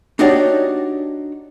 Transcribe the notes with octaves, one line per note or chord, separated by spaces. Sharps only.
D4 D#4 F#4 G4 C#5 D5